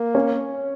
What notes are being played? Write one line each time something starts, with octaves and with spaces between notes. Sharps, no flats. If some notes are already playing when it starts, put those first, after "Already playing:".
Already playing: A#3
C#4